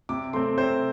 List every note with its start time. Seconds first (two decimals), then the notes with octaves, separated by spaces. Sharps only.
0.09 C3 D6
0.33 A3 C4 C6
0.57 C3 C5